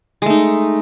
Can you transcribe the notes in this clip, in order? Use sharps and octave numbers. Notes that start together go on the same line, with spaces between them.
G#3 A3 D#4